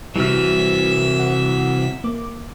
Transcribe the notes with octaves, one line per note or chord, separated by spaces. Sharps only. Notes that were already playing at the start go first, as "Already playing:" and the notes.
C2 C3 E3 G3 F#4 E5 F6
F#5
A#3 D6